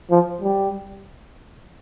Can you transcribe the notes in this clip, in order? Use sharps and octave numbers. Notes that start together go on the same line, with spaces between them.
F3
G3